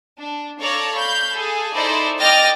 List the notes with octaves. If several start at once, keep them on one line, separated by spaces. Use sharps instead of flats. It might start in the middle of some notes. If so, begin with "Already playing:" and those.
D4
A4 C#5 D5 F5 A#5
F5 B5 G6
G#4 A4
D#4 E4 A4 C5 D5
D#5 G5 D6 F6 A6 A#6